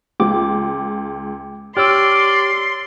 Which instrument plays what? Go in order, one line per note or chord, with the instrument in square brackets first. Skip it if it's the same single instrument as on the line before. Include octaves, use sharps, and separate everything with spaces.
[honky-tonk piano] C#2 [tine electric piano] G5 D6
[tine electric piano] G4 C#5 E6 [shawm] D5 [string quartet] C6 [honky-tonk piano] F6